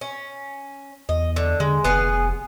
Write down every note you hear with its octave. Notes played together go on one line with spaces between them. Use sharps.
C#4
E2 D#5
D3
D3 G#3
F1 B3 G#4